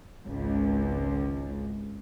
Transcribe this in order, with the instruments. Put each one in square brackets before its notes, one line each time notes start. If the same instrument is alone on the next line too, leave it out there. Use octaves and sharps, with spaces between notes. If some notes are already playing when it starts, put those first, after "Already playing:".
[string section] G#1 C#2